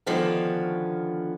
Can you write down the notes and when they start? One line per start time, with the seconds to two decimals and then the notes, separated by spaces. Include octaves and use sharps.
0.06 D3 D#3 F3 B3 C#4 F#4